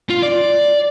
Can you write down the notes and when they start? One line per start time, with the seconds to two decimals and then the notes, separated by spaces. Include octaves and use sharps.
0.10 F4
0.23 D5